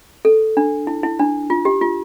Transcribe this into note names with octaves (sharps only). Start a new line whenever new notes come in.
A4
D4
E4
E4
D4
F4
G4
F4